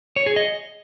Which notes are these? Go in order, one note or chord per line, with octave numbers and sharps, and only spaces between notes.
C#5
G#4
D#5